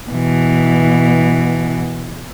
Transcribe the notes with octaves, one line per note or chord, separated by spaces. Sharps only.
B2 E3